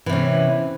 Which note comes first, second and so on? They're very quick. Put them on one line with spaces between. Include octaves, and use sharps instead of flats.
E3 C3 C#4